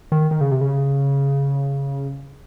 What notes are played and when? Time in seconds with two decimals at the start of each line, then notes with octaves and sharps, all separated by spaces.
0.12 D#3
0.31 D#3
0.41 C#3
0.51 C3
0.61 C#3